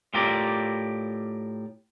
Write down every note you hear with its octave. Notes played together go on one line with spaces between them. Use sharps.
A2 F4 G4 A#4 D5